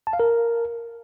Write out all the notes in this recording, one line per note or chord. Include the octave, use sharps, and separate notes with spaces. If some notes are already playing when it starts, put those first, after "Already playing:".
A5
F5
A#4